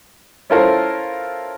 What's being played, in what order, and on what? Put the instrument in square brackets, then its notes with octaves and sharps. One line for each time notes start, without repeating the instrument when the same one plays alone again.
[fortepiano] C#4 E4 F4 A4 A#4 C5